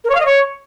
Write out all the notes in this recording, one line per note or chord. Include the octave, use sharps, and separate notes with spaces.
A#4
C#5
F5
D#5
C#5